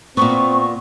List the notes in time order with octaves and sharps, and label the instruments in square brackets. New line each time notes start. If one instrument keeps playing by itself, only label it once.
[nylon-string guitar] A#2 B3 [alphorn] C4 [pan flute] C#6